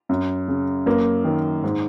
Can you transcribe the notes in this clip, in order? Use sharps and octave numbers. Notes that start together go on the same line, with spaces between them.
F#2
C#3
F#2 A#3
D#3
G#2